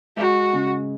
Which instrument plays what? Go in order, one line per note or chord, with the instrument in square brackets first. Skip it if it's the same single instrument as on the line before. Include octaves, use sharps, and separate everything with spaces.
[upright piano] G#3 [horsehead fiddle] F#4
[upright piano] C#3